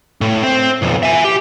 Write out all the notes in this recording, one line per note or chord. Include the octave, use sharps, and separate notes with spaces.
A2
C4 C5
B1 F2
E5 G#5
G4